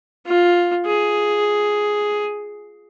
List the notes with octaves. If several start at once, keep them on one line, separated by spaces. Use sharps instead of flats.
F4
G#4